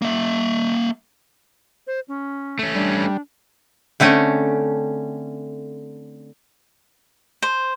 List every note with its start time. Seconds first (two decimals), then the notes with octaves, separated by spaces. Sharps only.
0.02 A#3 E5
1.87 C5
2.08 C#4
2.59 A3 C#4
2.75 G3 D4
4.00 D3 A3 C4 C#4
7.42 C5